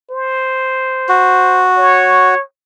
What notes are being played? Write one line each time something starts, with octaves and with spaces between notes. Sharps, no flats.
C5
F#4
C#5